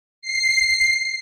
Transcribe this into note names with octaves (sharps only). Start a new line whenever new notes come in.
C7